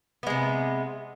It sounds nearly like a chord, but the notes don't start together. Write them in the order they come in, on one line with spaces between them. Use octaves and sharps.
B3 G#3 C3